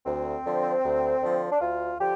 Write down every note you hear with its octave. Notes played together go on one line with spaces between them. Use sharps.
D2 C4
D3 F3
D2
D3 F3
D4
D2 F4
D3 F3 G4